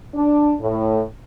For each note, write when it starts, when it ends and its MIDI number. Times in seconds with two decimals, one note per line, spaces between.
0.15 0.54 62
0.60 1.02 45